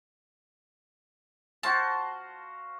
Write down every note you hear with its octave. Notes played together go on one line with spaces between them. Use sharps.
F#4 C5 F5 A5